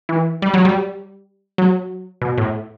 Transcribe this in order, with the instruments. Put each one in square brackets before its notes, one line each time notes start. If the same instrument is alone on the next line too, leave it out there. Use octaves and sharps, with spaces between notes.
[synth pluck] E3
G3
F#3
G3
F#3
B2
A2